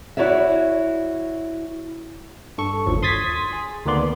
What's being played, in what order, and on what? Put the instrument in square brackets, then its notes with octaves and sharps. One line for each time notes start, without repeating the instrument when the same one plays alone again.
[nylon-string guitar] E4 F#4 C#5 D5 E5
[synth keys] G2 A4 C#6
G1 D#2 F3 F#3
C6 D#6 G#6 A6 B6
G#4
D2 D#3 A#3 B3 D5 C6